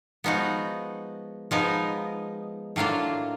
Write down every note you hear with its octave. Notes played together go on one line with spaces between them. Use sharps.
F3 G#3 B3 D#4 F#4
F3 G#3 B3 D#4
A2 F#3 A#3 D4 F4